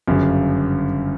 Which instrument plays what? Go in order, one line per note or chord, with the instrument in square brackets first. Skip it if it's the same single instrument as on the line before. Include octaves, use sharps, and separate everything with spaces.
[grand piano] G1 F#2 C#3